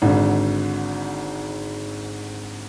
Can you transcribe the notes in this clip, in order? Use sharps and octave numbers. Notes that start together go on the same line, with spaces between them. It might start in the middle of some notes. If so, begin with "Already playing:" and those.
G#1 G#2 D3